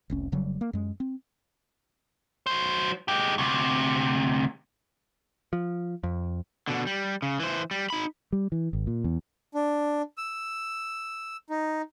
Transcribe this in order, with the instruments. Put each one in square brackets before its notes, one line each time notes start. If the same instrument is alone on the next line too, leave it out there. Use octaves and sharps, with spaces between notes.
[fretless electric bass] F1 C2 C#4
F1 C#3 F#3 G3
A#3
F#2 G#3
C4
[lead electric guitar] F#3 C5
G#3 G4
D2 C3
[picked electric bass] F3
F2
[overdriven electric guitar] B2 D3
G3
C#3
E3 C5
G3
D#4 B5
[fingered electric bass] G3
E3
G#1
A#2
E2
[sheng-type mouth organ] D4
E6
D#4